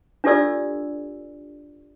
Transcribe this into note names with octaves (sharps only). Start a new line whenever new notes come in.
D4 F4 G4 A4 D5 E6